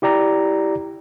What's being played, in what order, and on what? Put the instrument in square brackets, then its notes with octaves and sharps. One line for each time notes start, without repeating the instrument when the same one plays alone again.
[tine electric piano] E4 G4 D5 A#5